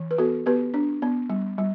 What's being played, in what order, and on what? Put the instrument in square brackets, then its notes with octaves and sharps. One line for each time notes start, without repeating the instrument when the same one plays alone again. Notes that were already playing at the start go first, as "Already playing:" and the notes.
Already playing: [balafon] E3
B4
B3 F#4 A4
B3 G4 B4
D4
B3
G3
G3